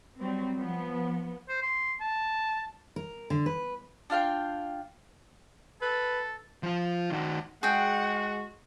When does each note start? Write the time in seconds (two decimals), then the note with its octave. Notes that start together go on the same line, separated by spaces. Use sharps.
0.18 F#3 G3 C4
0.56 F3 B3
1.49 C5
1.62 C6
2.00 A5
2.96 A#4
3.30 D3
3.46 B4
4.10 D4 F4 F5 G5
5.82 A4 B4
6.63 F3 F4
7.11 D#3 F#4
7.63 G#3 F#4 G#4 F#5 G5